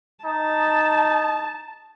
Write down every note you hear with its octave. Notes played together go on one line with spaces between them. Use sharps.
D#4 A5